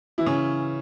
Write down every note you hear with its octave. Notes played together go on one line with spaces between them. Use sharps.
E3 E4
C#3 C#4